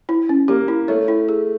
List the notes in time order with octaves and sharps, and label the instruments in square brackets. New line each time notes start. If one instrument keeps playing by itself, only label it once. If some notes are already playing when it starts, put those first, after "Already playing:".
[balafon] E4
C#4
[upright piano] A#3 [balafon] G4
[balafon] E4
[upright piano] A3 [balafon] C#5
[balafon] E4
G#4